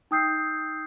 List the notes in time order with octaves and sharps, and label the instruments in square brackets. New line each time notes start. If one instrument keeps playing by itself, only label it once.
[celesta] D#4 G5 D#6 E6 G6 C7